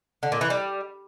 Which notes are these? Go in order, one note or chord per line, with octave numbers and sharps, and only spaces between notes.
D3
A#2
E3
G3